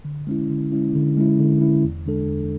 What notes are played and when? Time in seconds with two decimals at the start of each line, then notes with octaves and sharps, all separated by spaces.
0.05 D3
0.27 G#3 C#4 E4
0.49 D3
0.72 G#3 C#4 E4
0.95 D3
1.17 G#3 C#4 E4
1.39 D3
1.61 G#3 C#4 E4
1.84 E2
2.06 D3 G#3 D4 A4
2.28 E2